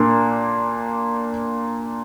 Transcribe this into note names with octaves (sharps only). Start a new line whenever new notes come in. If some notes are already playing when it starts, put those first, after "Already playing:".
Already playing: A#2 A#3 D4